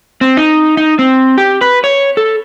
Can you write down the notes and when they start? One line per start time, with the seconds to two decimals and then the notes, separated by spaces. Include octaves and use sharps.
0.21 C4
0.37 D#4
0.77 D#4
0.99 C4
1.37 G4
1.61 B4
1.84 C#5
2.17 A4